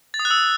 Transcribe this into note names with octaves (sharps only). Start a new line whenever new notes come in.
A6
D#6
F#6
E6